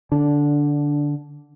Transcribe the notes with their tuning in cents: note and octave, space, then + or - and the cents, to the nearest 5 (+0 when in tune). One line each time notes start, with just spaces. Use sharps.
D3 +0 D4 -15